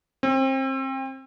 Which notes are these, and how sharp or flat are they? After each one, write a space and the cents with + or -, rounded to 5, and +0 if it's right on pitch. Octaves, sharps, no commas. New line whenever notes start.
C4 +30